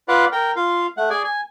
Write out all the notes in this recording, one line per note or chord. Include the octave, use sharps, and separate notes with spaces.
F4 B4 D5 F5 F#5
A#4 G5
F4 F5
A3 F#5
G#4 D5 G#5
G#5